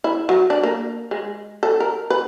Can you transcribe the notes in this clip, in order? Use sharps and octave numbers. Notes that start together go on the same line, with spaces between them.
E4
F#3
D4
A#3
G#3
A4
A#4
B4